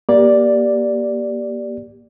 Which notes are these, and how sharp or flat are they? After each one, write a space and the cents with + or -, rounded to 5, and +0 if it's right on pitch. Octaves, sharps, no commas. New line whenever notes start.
A#3 +25 G4 +0 D5 +0